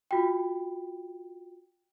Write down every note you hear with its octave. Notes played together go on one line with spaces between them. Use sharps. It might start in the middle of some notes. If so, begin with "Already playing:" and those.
F4 F#4 G5